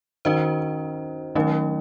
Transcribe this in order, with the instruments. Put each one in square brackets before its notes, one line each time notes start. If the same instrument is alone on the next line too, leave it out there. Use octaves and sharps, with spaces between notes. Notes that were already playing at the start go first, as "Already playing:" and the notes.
[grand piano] D#3 [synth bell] C#4 F#4 C5
[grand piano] D#3 [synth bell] F#3 A3 C#4